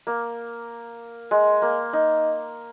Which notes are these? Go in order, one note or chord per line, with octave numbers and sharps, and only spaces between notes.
A#3
G#3
A#3
D#4